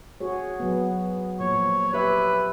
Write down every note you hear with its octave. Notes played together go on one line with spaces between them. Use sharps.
F#4 G#4 C#5
F#3 B3
A#2 F3 C#5
G4 B4 E5